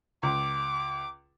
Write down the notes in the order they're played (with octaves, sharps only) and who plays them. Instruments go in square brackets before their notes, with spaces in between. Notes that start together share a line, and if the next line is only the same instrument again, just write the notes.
[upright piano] C#2 [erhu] D6